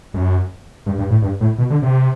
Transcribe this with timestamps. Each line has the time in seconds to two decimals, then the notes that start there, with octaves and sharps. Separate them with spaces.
0.14 F#2
0.86 G2
0.98 G2
1.10 A2
1.22 G2
1.41 A2
1.58 B2
1.70 D3
1.82 C3